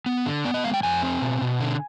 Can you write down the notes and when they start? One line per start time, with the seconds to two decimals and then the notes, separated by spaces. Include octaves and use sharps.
0.06 B3
0.26 D3
0.45 B3 D5
0.54 D#5
0.64 G#3 F5
0.74 G5
0.83 F2 G#5
1.03 C4
1.22 B2
1.41 B2
1.60 D3